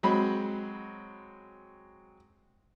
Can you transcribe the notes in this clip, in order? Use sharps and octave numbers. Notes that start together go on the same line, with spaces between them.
F#3 G#3 C4 B5